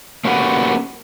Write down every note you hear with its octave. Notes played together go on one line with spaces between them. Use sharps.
A#3 C#4 F#4 G4 A4 B4